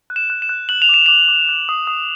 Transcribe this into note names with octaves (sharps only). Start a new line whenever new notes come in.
F#6
E7
F#6
E7
F#6
F#6 F#7
F7
D6 E7
D6 F7
D6
F#6
D#6
D#6